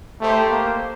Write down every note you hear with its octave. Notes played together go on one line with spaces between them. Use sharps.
A3 D#4 G4 C5
A#3